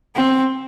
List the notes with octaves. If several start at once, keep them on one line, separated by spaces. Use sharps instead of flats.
C4